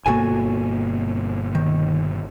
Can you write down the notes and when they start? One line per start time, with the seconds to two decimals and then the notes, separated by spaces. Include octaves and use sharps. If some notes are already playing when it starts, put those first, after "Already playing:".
0.06 G1 B2 A#3 F#4 A4 G#5
1.55 D#3